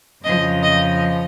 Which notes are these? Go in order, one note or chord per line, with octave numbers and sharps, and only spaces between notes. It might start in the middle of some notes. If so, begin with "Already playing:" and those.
F2 C#3 F3 D#5
D#5